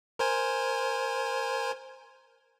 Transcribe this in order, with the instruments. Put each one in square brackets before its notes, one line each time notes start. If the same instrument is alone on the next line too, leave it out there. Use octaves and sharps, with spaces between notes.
[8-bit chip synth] A#4 C5 G#5